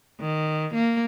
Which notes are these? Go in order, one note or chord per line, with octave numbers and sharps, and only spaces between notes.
D#3
A#3